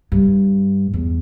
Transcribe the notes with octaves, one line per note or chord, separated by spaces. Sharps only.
G2
E2